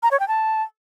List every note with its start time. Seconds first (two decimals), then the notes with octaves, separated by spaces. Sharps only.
0.03 A#5
0.11 C#5
0.20 G5
0.28 A5